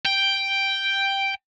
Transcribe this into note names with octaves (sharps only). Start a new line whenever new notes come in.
G5